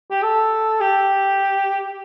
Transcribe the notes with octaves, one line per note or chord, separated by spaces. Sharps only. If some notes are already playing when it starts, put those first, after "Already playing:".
G4
A4
G4